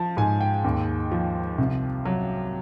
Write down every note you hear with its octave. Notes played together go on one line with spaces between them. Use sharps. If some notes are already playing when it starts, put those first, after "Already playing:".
Already playing: F3 A5
G#2 G#5
G5
D#2
F3
C2
F#3